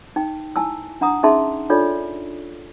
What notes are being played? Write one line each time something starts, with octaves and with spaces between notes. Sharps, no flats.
D#4 G5
E4 G#5 A5 E6
D4 F#5 A#5 D#6
C#4 D#4 G#4 E5 A5 C6
D4 D#4 F4 A4 C#5 D5